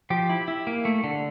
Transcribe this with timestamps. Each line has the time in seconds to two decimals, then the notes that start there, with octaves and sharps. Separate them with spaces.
0.10 F3 G4
0.30 E4
0.48 E4
0.67 A#3
0.85 A3
1.04 D3